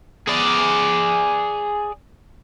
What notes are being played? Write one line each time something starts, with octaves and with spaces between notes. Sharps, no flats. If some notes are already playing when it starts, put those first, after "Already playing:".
G#4 D5